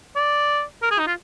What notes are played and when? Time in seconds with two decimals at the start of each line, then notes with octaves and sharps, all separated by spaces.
0.16 D5
0.83 A#4
0.91 G#4
0.99 D#4
1.07 F4